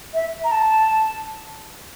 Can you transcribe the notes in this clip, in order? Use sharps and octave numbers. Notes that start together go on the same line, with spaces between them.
E5
A#5
A5